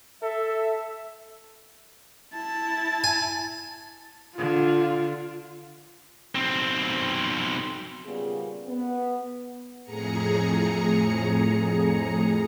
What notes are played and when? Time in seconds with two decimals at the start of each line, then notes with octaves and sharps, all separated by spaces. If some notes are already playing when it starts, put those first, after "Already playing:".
0.22 A4 E5
2.34 E4 A5
3.04 G#5
4.38 D3 F4
6.35 B1 C4
8.06 A#2 C#3 G3 A#3 B3 G#4
8.68 B3
9.84 F2 A2 G#4 A#5 C#7